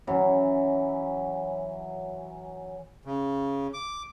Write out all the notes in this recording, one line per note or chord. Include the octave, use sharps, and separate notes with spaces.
E3 F#3 C#4
C#3
D6